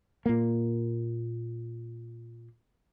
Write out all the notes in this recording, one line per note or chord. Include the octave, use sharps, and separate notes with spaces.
A#2 A#3